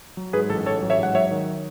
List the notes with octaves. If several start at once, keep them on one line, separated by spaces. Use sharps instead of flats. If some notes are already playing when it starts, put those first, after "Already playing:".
F#3
G#2 G#4 B4
A1 A4
A1 A4 C#5
F#3
C#5 E5
G#2
F#5
F#3 C#5 E5
D#3